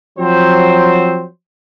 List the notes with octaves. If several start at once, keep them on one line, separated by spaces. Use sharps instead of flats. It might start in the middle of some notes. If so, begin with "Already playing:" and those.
F3 F#3 C4 C5